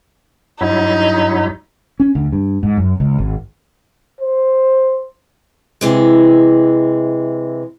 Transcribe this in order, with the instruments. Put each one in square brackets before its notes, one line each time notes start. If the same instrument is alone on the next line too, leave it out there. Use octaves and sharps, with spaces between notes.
[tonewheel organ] G2 F#3 E4 [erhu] D#4
[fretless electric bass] C#4
D2
G2
G#2
F#2
C#2
G#1
[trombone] C5
[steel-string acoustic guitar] C3 E3 G#3